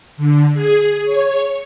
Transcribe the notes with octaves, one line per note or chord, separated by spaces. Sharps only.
D3
G#4
C#5